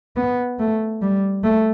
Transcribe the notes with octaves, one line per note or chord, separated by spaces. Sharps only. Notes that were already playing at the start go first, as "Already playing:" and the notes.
B3
A3
G3
A3